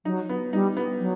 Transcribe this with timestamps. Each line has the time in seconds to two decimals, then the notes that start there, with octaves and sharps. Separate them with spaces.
0.05 F#3 D#4
0.29 B3
0.52 G3 D#4
0.77 B3
1.00 F#3